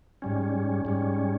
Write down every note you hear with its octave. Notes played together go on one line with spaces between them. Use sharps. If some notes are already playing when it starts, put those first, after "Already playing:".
G#2 G3 C#4
G#2 G3 C#4